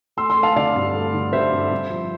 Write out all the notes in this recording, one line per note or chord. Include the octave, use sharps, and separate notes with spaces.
A3 C6 E6
C6 E6
A3
F5 A5
D3 D5 F5
G2
A3
D3
G2 C5 E5
G2
G2
F3